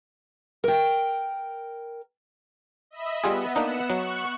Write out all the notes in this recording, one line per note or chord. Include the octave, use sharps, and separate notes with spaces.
A#4 G5
D#5 E5 B5
G3 B3 F4 G#4
A#3 D4 D#4 F#5 E7
F#3 C#6 F#6